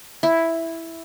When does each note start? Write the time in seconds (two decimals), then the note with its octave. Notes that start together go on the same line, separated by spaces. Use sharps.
0.23 E4